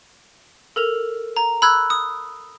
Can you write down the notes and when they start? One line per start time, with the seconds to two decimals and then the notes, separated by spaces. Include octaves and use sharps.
0.76 A4 A#4 F7
1.37 A#5
1.62 B5 E6 F#6 G#6
1.90 D#6